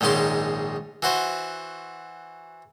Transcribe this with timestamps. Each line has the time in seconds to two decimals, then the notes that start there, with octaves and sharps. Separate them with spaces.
0.01 A#1 G#2 D#3 C#4 C6
1.02 E3 F#4 C5